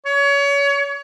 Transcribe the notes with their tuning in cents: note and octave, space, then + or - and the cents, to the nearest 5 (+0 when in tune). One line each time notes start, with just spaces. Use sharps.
C#5 +30